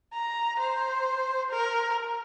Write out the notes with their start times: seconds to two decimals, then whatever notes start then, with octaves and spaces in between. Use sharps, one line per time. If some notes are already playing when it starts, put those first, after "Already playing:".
0.13 A#5
0.59 C5
1.51 A#4